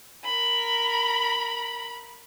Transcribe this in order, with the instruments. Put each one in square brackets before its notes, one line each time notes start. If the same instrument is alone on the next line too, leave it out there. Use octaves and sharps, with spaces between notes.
[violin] A#4 B5